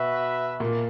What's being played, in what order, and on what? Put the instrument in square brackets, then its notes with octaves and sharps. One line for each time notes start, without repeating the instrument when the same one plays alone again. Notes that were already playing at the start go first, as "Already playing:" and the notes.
Already playing: [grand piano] B2 [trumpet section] F#4 B4 E5
[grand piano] A#2 A#3